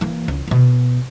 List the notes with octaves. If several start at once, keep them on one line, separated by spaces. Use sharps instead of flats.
E3 A#3
C#2
B2 B3